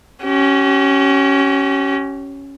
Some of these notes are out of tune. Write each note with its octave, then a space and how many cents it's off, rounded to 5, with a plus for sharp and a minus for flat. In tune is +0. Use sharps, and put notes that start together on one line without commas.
C#4 +0 G4 -40